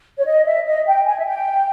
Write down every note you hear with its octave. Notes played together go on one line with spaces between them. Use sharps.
C#5
D#5
E5
D#5
G5
G#5
E5
G5